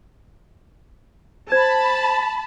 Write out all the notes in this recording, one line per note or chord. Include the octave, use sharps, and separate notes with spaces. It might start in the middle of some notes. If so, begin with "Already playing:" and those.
C5 A5 B5 G#6